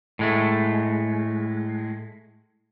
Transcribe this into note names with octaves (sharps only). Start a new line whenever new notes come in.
A2 G#3 A3